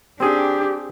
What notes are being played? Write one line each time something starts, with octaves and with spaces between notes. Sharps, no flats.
C4 D4 G4 G#4